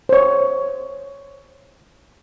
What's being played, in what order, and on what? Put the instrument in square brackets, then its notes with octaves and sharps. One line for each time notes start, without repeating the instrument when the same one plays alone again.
[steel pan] C5 C#5